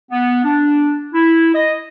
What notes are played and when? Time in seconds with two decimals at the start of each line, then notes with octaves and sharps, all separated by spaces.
0.12 B3
0.44 D4
1.14 E4
1.55 D#5